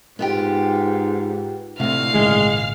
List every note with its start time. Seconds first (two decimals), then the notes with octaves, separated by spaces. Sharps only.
0.19 G#2 B3 F4 G4
1.80 D2 A2 C3 F5
2.14 G#1 A#2 C#3 G#3